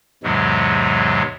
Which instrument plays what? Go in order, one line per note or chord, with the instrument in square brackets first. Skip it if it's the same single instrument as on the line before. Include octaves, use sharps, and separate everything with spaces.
[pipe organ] E2 G#2 C3 E3 F#3 G#3